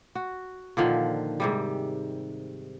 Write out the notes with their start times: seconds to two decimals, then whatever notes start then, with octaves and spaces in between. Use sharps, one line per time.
0.15 F#4
0.77 A#2 D3 D#3 F3
1.40 G#2 C3 G3